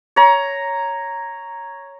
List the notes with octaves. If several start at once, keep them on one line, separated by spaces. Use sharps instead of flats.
C#5 A#5